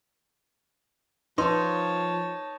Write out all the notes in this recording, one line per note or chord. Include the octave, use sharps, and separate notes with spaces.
F3 D#4 B4 C#5 A5 C6